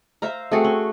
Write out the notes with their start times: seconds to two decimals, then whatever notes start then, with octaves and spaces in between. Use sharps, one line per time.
0.22 C5 E5 F5 A#5
0.52 A3 C4 F#4 G#4
0.64 C#4